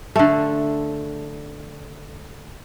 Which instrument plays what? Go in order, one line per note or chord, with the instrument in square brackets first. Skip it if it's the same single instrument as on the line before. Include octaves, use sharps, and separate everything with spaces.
[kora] D3 A3